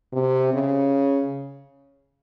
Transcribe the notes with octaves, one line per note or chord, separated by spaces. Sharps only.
C3
C#3